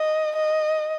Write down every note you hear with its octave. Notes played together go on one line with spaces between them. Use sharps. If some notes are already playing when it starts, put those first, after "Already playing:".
Already playing: D#5
D#5